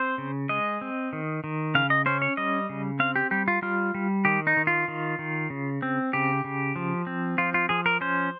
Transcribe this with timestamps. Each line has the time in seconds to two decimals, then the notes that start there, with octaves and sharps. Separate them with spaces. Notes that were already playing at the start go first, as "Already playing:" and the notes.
Already playing: C4 C5
0.18 C#3
0.49 G#3 D#5
0.81 C4
1.13 D#3
1.44 D#3
1.75 C#3 F5
1.90 D#5
2.06 C#4 C5
2.22 C#5
2.37 G3 D#5
2.69 C#3
3.00 C4 F5
3.16 G4
3.31 G3 G4
3.48 F4
3.62 G3 F4
3.95 G3
4.25 D#3 G4
4.47 D#4
4.57 D#3
4.67 F4
4.88 D#3
5.19 D#3
5.50 C#3
5.82 C4
6.13 C#3 G4
6.44 C#3
6.76 F3
7.07 C4
7.38 F3 F4
7.54 F4
7.69 F3 G#4
7.86 A#4
8.01 C#4 C5